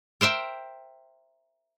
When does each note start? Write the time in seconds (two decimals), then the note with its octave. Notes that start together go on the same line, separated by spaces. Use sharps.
0.21 A#4 C5 E5 G5